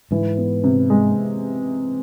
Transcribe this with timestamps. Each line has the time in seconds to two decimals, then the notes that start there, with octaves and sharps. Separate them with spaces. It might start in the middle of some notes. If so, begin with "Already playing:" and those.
0.11 G#2 E3
0.37 B3
0.64 C3
0.90 G#3